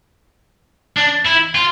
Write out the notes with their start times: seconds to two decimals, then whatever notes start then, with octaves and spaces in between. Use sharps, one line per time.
0.97 D4
1.26 E4
1.55 F4